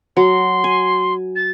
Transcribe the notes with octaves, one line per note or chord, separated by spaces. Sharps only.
F#3 C6
G#5
A6